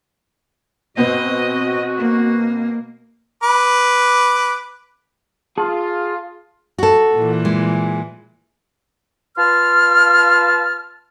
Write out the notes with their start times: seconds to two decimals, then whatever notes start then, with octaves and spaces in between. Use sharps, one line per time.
0.97 B2 B3 C4 F#4 D#5
1.98 A#3
3.43 B4 D6
5.58 F4 G#4 A5
6.78 F#4 A4
7.14 A#2 E3
7.45 G#3
9.37 F4 B4 A5 C6 F6